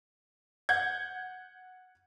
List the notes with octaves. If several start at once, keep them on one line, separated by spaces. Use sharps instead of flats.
F#5 G6 G#6